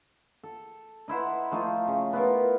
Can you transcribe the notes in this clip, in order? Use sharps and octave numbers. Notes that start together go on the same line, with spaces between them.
A4
D#4 E4 C5 F#5
F3 A3 D#4 F4
C#3
B3 E4 F4 A#4